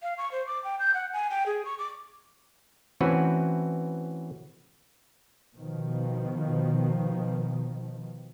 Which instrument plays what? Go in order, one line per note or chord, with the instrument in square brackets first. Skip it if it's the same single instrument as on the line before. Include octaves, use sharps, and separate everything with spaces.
[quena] F5
C#6
C5
D6
G5
G6
F#5
G#5
G5
G#4
C#6
D6
[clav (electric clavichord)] E3 A3 C4 C#4 F#4 B4
[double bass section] B2 D#3 F3